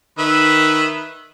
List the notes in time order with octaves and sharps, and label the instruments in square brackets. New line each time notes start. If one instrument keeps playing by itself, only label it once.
[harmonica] D#3 B4 E5